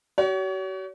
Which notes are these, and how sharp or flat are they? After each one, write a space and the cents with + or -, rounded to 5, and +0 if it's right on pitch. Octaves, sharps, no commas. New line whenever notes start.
F#4 +45 C#5 +35